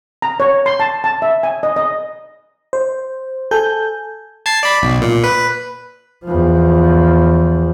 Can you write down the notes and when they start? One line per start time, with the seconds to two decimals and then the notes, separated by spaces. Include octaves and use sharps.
0.22 A#5
0.40 C#5
0.66 C6
0.80 A5
1.04 A5
1.22 E5
1.43 G#5
1.63 D#5
1.76 D#5
2.73 C5
3.51 A4 G#5 G6
4.46 A5 G#6 C7
4.63 D5 B5
4.82 B1
5.01 A#2
5.24 B4
6.24 E2 F3